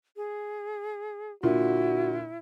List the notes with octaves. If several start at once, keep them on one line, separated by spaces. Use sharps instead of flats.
G#4
A#2 D3 E4 F#4